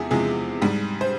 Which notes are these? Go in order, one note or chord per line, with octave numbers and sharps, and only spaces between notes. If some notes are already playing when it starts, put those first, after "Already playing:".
Already playing: E2 C3 F3 G#3 G#4 E5
E2 C3 F3 G#3 G#4
G#2 G3
C5